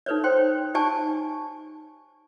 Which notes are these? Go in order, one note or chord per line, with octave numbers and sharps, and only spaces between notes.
D#4 A4 B4 C#5 D5
C5 C#5 G5 C6
D#4 G4 D5 G#5 A5 C#6